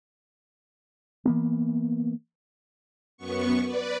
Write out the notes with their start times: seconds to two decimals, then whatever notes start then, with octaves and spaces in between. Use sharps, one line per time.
1.25 E3 A#3 B3
3.17 F#2 B3 C#6
3.64 B4 D5